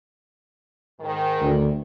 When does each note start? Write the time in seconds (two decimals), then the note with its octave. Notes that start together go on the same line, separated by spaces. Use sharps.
1.00 G#2 D#3
1.42 D2